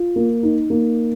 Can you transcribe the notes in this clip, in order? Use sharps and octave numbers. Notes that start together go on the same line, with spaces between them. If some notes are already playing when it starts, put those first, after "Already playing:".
Already playing: F4
A#3
D#4
A#3